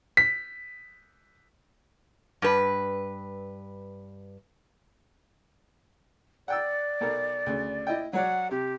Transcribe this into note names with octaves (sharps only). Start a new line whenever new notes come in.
B6
G2 B4
D5 F#5 G5 E6
B1 A4 A#4
D2 C#3
E4 D#5 G5
F#3 C#5 D5 F#5
C3 G4